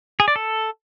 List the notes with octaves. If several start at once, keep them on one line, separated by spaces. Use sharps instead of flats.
G#4
D5
A4